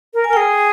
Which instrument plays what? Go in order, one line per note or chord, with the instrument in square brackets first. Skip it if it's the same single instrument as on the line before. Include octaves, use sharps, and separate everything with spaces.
[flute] A#4
[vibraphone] G#5
[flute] A#4
[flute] G#4 [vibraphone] G5
[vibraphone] G#5